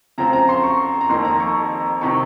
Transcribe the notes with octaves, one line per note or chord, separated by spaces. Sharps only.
C#3 F3 C4 A#5
A#5
C6
C#6
A#5
F2 D#3 A#3 C6
A#5
C#6
C3 D#3 C#6